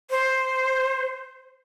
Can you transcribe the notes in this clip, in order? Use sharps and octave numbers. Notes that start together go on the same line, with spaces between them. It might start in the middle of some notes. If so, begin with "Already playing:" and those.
C5